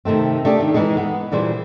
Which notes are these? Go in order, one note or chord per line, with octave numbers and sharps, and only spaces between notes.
C3 D#3 A3 C4
A3 D4 G4 G#4
D#3
E3 F3 G#3 D#4 G#4
B3
A#2 E3 G3 G#4 C5